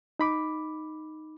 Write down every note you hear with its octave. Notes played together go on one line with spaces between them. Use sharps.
D#4 B5 D6